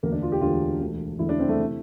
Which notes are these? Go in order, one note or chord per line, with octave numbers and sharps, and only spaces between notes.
E1 D2 D3 A#3
D4
F4
G4
E1 D2 D3 F4
E1 D2 D3
E1 D2 D3 E4
D4
C4
A3
C3 E3